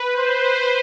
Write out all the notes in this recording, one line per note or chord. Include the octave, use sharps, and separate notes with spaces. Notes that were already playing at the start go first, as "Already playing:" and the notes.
Already playing: B4
C5